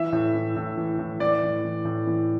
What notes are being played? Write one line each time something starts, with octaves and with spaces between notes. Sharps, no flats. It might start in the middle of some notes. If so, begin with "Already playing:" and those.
Already playing: E3 E5
A2
E3
A2
E3
A2
E3 D5
A2
E3
A2
E3